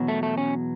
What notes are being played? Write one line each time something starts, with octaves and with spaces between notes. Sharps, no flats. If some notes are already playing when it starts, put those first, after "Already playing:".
Already playing: E2 B2 F#3
A3
A3
C#4